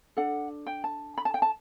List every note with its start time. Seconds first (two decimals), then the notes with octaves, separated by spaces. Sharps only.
0.17 D4 A4 F#5
0.66 G5
0.84 A5
1.18 B5
1.25 A5
1.34 G5
1.42 A5